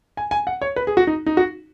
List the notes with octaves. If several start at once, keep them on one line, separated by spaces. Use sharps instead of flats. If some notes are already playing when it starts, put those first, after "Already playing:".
G#5
G#5
F#5
C#5
B4
G#4
F#4
D#4
D#4
F#4